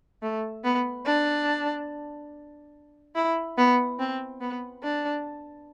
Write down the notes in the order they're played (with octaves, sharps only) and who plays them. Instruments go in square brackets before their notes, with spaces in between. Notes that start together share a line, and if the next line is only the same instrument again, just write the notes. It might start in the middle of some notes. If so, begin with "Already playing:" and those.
[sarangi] A3
B3
D4
E4
B3
C4
B3
D4